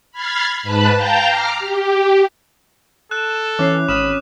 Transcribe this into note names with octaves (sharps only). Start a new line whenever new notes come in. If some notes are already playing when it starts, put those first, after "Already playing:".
B5 F6 G#6 A6 C7
G#2 B4 A5 B5 F#6
F5 G5 A5 A#5 F6 G6
A#5 D6 F6 C7
G4
A4 F#6 E7
E3 C#4 D6 C7
G#1 B5 D#6 F6 D#7 E7